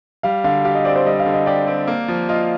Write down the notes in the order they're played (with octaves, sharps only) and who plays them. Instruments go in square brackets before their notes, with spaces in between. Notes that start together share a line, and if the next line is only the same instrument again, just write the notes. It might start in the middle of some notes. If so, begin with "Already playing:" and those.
[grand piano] G3 [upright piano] F5
[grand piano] D3 [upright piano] F5
[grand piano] G4 [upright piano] F5
[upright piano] D#5
[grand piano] C4 [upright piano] D5
[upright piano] C5
[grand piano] G3 [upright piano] D#5
[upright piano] F5
[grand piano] D3
[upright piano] D#5
[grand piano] G4 [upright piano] D5
[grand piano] C4
A#3
F3
[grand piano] F4 [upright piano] D#5